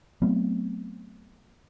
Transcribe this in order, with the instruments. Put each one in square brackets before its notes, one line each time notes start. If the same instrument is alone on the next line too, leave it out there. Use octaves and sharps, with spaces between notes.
[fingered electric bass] F#3 A3 B3 C4